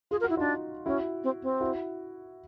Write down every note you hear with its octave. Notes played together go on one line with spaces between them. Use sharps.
F4 G#4
A#4
F#4
E4
D4 D#4 F4
C#4 E4 F#4
C4
C4
E4 F#4